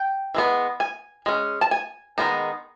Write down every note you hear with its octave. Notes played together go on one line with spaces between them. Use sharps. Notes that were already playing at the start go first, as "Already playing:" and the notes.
Already playing: G5
E3 G#3 B3
G#5
G#3 C#4
A5
G#5
D#3 G#3 B3 D#4